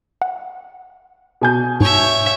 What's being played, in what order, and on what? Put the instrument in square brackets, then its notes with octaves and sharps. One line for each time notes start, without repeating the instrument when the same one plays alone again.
[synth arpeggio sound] F#5
[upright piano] B2 G#5 G6
[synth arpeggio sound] G#2 [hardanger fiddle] C#5 E5